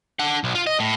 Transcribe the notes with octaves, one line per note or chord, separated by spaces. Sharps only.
D4 F#5
B1
F4
D#5
A2